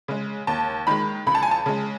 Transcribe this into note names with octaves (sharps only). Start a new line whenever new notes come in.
C#3 G#3
D#2 A5
D#3 G#3 B5
C#2 B5
A5
G#5
A5
C#3 G#3